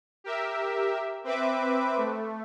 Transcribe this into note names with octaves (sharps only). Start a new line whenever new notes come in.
G4 A#4 E5
C4 B4 E5 D6
A3